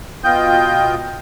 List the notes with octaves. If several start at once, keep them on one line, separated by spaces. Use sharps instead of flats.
B2 F4 D#5 G5 G6